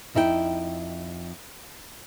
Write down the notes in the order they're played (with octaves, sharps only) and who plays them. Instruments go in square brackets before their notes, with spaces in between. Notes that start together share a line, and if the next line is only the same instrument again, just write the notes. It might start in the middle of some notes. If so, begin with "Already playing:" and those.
[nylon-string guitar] F2 D#4 E4 A4 G5